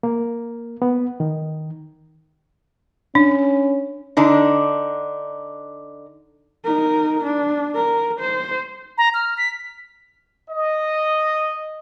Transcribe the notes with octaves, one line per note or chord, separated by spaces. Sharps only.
A#3
B3
D#3
C#4 D4
D3 D4 D#4
D#4 A#4
D4
A#4
C5
A#5
F6
B6
D#5